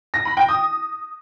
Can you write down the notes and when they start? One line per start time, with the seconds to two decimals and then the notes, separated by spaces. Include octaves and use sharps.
0.14 A#6
0.25 B5
0.37 G5
0.49 D#6